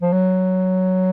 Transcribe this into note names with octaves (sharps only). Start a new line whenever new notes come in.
F3
F#3